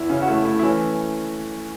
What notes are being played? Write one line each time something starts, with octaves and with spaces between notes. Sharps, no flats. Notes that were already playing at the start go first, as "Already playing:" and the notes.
Already playing: E2 E4
C#3 C#4
F#4
A3 E4
A3 E4
E4
E3 C#4